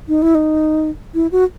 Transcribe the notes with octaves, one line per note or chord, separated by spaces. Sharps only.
D#4
E4
D#4
E4
F#4